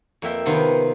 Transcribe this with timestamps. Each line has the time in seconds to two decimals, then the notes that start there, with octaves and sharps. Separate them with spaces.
0.22 F2 A#3 E5 G5
0.46 C3 D#3 B3 C4 F4